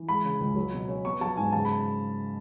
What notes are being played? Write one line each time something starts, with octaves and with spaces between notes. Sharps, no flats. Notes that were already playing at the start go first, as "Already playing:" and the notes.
Already playing: E3
G#3 B5
C#3
C#2
F#3
B2
C#4
B3 C#6
F#3 A5
G#2 G#5
C#3 A5
B5